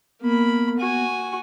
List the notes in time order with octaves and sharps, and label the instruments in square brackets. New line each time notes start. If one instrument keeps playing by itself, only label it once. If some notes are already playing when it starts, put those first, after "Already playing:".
[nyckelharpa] A#3 B5 [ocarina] B3
[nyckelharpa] F#4 G#5